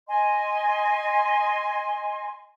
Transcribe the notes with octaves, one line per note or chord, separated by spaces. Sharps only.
D#5 G#5 C6